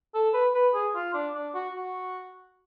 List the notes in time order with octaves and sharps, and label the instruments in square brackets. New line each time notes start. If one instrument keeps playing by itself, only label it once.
[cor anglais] A4
B4
B4
G#4
F4
D4
D4
F#4
F#4